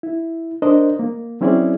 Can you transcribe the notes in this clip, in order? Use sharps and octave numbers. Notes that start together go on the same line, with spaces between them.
E4
D4 A#4 C5 D#5
A#3
F#3 C4 C#4 E4 G#4 D5